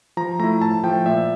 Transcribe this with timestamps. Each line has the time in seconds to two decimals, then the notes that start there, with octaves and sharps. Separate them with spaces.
0.17 F3 A#5
0.39 A3 E4 A#5
0.61 A2 A5
0.84 F3 A3 G5
1.06 A#2 E5